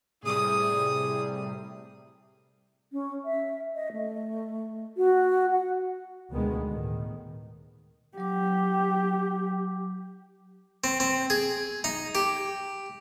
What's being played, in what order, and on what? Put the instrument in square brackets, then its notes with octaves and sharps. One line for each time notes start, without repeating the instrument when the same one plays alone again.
[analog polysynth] A2 C3 G3 [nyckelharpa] G#4 D#6
[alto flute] C#4
E5
D#5
A3
F#4
F#5
[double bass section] D2 B2 D#3 G#3 B3
A2 D#3
[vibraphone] F#3 D6 [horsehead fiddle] G4
[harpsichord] C4
C4
G#4
D#4
G4